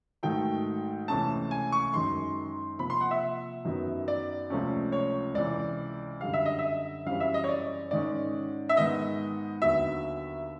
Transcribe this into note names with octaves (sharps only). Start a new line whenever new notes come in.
G#2 D#3 F#3 A3 G5
C#2 C3 E3 A3 C#4 A5
G#5
C#6
F#2 D#3 G#3 C6
C3 F3 A#3 B5
C6
F#5
E5
F#2 D#3 F#3 B3
D5
C#2 C3 F3 A3 C#4
C#5
C#2 C3 E3 D5
F#2 D3 G3 F5
E5
D#5
E5
F#2 C#3 E3 G3 C4 F5
E5
D#5
C#5
D5
G#2 D#3 G#3 C#4 D5
E5
G#2 D#3 G#3 B3 D#5
D#2 D3 F#3 B3 E5